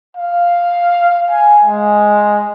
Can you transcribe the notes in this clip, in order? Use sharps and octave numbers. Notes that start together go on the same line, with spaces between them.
F5
G#5
G#3